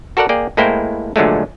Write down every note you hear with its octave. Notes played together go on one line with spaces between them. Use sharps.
F#4 A4 A#4 D5 F#5
A#3 G#4 D5 G5
A2 G#3 A#3 E4 C5 G5
A#2 D3 F3 F#3 G#3 A3